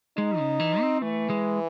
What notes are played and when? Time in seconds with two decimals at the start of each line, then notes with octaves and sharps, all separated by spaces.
0.17 G#3 D#4
0.39 C#3
0.60 E3
0.81 C4
1.02 E3 A3
1.30 G#3